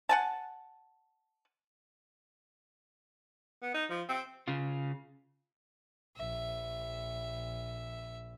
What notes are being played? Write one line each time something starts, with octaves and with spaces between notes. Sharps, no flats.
F#5 G#5 A5
B3
D#4
F3
C4
C#3 F4
A#1 E5